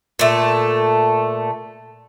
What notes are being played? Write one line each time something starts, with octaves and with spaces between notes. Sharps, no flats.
A#2 A3